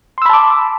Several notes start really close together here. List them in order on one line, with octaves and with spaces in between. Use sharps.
C6 E6 B5 A5 D6